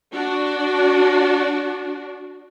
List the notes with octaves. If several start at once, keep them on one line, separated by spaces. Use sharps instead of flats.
D4 F#4